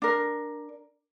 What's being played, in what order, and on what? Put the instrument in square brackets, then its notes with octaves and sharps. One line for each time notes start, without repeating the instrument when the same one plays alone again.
[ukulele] D4 A#4